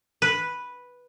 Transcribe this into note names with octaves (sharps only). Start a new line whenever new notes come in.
B4